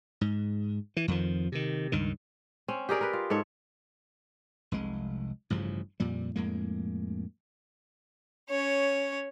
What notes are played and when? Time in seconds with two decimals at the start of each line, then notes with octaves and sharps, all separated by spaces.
0.21 G#2
0.97 E3
1.08 F2 D#3 F3
1.52 C3 D#3
1.92 C#2 G2 D#3
2.68 C4 C#4
2.89 G4 G#4 A#4 D5
3.01 A#4 B4
3.13 F4
3.30 G#2 A4 C#5
4.72 F1 C2 G#3
5.50 A1 G2 C#3 F3
6.00 F2 A#2 G3
6.36 F2 A2 G#3 A#3
8.49 C#4 C#5